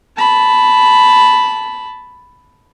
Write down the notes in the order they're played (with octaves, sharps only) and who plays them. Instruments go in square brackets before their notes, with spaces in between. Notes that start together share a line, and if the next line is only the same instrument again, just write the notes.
[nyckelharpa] A5 B5